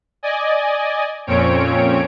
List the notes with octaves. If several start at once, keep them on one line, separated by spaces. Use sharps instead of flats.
D5 D#5 G#5
F2 A#2 C4 C#4 C#5 D7